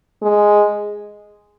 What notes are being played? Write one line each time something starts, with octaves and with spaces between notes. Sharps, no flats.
G#3